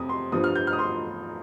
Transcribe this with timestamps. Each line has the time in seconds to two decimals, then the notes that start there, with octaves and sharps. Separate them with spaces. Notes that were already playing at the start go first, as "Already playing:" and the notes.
Already playing: F2 C3 G3 D#6
0.09 C6
0.32 G2 F3 D#6
0.44 F6
0.55 G6
0.67 F6
0.73 D#6
0.79 C6